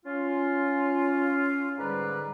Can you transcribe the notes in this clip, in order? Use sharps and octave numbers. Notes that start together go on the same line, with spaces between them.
C#4 F4
G#2 D3 G3 B4 D5 A#5